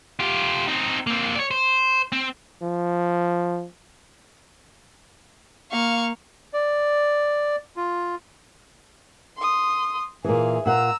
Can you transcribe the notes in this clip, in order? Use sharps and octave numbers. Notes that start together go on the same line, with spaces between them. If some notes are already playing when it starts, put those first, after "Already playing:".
F4 G4
C4 D#4
A#3 C4
C#5 D5
C5
C4
F3
A#3 F5 C#6
D5
F4
C6 D#6
A#2 E3 G#4 F5
A#2 F#5 A#5 E6